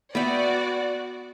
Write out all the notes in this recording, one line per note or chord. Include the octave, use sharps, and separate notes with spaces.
B3 F#4 D5 E5 G5